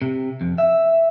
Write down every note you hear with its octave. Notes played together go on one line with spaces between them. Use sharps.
C3
F2
E5